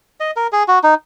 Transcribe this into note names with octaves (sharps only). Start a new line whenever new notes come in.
D#5
A#4
G#4
F#4
D#4